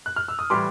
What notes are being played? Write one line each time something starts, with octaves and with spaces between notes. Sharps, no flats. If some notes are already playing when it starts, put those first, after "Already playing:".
F#6
F6
E6
D#6
A2 E3 G3 C6 D6